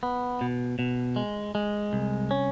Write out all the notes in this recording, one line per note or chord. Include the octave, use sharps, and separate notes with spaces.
B3
B2
B2
G#3
G#3
C2
C#4